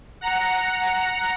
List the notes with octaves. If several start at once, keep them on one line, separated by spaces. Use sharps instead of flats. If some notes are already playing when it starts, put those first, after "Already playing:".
F#5 A#5 C#7